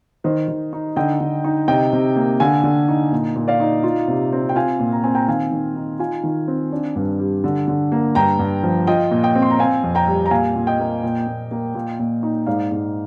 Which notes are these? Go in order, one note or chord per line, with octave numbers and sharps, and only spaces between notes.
D#3 C5 D#5
D#3
D#4
D3 D#5 G5
D3
D#4
C3 D#5 G5
C3
A#3
D3 F5 G#5
D3
D#4
A#2
A#2
D5 F5
D#4
F4
C3
C4
G5
F4 F5 G#5
A#2
A#5
C4 G#5
G5 A#5
D#3 F5 G#5
D#3
D#4
F4 F5 G#5
D#3
C4
D4
G2
G3
D3
D3
A#3
G2 G5 A#5
G2
F3
F4 D#5 G5
A#2
D#5 G5
C4
C6
A#5
C4 F5 G#5
F2
G5 A#5
G3
A#5
A#2 F5 G#5
A#2
D#5 G5
A#3
A#2
A#2
A#3
A#2
A#2
D#4
G#2 D5 F5
G#2